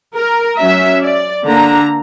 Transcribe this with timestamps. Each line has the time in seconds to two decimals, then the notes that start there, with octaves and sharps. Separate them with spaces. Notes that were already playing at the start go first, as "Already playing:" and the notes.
0.16 A#4
0.59 F#3 C#4 E5
1.03 D5
1.46 D3 A#3 D4 A#5